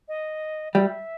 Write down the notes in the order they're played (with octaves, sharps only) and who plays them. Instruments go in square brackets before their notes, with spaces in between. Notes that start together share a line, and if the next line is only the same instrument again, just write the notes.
[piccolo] D#5
[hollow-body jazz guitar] G3 [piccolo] E5